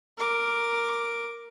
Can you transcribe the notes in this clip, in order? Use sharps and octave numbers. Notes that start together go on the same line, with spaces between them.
A#4 D6